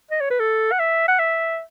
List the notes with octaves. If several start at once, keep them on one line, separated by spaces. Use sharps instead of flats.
D#5
C#5
B4
A4
F#5
E5
F#5
E5